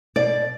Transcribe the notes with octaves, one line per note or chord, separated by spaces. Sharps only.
B2 D5